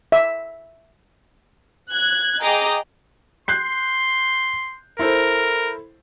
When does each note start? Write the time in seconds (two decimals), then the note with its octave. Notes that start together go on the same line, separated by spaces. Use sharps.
0.12 E5
1.91 F#6 G#6
2.40 G#4 D#5 G5 A#5 D6 D#6
3.48 C6 F#6 G6 C7
4.99 E4 A4 A#4 C5